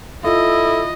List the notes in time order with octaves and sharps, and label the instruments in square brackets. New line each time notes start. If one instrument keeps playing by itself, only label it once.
[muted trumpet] E4 [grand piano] F4 [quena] A4 [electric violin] D#5